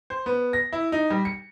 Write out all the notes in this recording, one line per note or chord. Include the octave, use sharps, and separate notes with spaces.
C5
B3
A#6
E4
D#4
G3
C#7